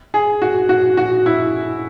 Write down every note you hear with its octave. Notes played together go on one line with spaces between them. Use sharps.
G#4
F#4
F#4
F#4
E4